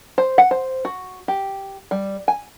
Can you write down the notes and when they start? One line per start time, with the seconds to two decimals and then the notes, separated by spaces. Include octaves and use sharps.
0.18 C5
0.38 F#5
0.51 C5
0.85 F#4
1.28 G4
1.91 G3
2.28 G#5